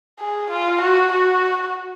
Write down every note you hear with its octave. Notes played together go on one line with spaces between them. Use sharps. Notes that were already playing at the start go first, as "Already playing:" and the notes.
G#4
F4
F#4
F#4